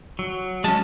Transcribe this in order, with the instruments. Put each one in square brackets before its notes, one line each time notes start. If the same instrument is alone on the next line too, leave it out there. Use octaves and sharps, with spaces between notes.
[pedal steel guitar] F#3
[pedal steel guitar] G#3 C#4 [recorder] A5